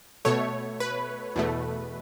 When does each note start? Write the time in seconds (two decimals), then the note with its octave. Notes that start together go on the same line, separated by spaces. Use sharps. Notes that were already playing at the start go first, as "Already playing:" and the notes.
0.25 B2 A3 C#5
0.80 B4
1.36 E2 B2 A3